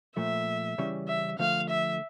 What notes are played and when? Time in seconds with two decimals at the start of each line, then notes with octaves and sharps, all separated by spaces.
0.17 A#2 F3 A3 E5
0.78 C#3 E3 G3 C#4
1.08 E5
1.39 D3 F3 A3 F5
1.70 E5